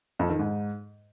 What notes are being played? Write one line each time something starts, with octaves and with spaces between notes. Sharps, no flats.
F2
D#3
G#2